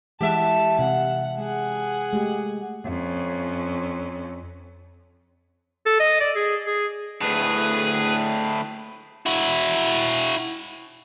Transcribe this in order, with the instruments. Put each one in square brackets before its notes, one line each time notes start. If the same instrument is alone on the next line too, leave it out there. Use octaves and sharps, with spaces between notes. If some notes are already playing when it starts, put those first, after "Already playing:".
[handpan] E3 G#3 F#5 [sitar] G4 E5 [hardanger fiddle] A5
[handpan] C3 [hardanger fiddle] F#5
[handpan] G#3 [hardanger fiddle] G#4 F#5
[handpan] G#3 A3 G4
[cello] F2 C#4
[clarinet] A4
D#5
D5
G#4
G#4
[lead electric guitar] D2 A2 [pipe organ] G#4 B4
[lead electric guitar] E4 F#4